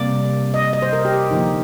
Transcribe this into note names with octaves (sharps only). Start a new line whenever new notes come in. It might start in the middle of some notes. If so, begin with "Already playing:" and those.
Already playing: C3 G3 A#3 D5
D#5
D#5
C5
A#4
G4
D3 F3 A#3 D#4